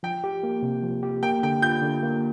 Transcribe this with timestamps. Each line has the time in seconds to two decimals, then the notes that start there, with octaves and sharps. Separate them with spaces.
0.03 F3 G5
0.24 G4
0.43 A#3
0.62 C3
0.83 F3
1.03 G4
1.23 A#3 G5
1.43 D3 G5
1.62 F4 G6
1.82 D3
2.03 A#3